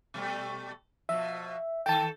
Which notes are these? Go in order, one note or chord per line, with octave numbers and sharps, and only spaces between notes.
B2 G3 A3
B2 F3 E5
D#3 A4 G5 A5